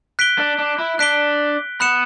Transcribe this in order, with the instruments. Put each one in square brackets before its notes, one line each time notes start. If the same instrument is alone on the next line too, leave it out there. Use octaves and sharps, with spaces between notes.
[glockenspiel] F#6 B6 D7 G7
[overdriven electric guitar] D4
D4
E4
[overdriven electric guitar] D4 [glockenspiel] F#6 B6 D7 G7
[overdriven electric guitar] B3 [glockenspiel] B5 F#6 C#7 E7